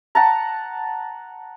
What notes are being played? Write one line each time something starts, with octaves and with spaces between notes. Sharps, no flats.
F#5 A5 A#5